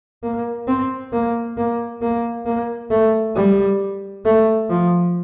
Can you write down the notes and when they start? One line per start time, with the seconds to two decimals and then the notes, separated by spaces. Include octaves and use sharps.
0.23 A#3
0.67 C4
1.12 A#3
1.57 A#3
2.02 A#3
2.46 A#3
2.91 A3
3.36 G3
4.25 A3
4.70 F3